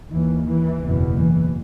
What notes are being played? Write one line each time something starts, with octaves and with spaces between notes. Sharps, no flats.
D#2 E3
E3
F#1 E2 B2
E3